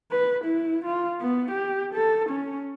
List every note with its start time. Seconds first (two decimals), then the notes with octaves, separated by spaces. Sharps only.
0.12 B4
0.45 E4
0.85 F4
1.21 B3
1.51 G4
1.94 A4
2.30 C#4